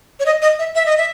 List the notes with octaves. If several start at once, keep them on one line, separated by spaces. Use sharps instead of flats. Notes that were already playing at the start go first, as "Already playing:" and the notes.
C#5
D#5
D#5
E5
E5
D#5
E5